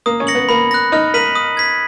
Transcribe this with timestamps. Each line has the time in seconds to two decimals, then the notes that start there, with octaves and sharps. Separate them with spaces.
0.06 A#3 D#6
0.20 C#4
0.27 A#6 C#7 F#7
0.35 B3
0.49 A#3 B5
0.71 F#6 A#6
0.92 D#4 F6
1.14 A#4 B6 D#7 F#7
1.35 D#6
1.57 G#6 B6